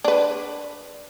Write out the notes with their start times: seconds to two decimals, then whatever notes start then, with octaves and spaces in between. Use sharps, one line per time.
0.04 D4 B4